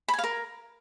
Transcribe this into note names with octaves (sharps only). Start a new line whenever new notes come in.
B5
G#5
F5
A#4